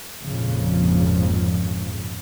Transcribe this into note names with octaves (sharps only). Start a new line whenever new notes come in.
G#1 F2 A#2 C#3 F3